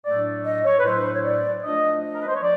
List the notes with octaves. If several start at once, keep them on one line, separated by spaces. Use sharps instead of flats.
A2 F#3 A3 D4 D5
D#5
C#5
B4
A2 F#3 A3 D4 C5
C#5
D5
F3 A3 D4 D#5
D#5
A#4
B4
C5
C#5
F3 D5